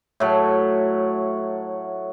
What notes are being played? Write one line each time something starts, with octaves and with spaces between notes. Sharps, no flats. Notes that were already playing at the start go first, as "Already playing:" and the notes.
A2 F#3